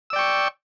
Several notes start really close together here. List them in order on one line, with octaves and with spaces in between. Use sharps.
E6 D5 G5 C#6